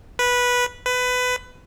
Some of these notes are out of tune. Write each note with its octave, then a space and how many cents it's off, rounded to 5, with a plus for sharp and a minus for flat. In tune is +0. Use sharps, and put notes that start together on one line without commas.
B4 -10
B4 +20